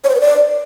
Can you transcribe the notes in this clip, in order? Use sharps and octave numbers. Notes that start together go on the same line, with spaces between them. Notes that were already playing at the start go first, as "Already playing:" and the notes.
C#5
C5
B4
D5